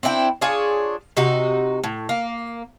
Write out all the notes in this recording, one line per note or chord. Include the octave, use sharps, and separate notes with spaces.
C4 D4 E4 G5
D4 F4 G#4 C#5
C3 D#4 F#4
A2
A#3